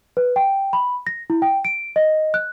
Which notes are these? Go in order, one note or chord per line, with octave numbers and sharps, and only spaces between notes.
B4
G5
B5
A#6
E4
G5
D7
D#5
F#6